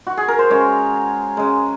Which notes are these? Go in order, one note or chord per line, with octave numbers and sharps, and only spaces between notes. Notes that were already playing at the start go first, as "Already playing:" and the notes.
F#4
G#4
A#4
C5
C#3 G#3 C#5
C#3 G#3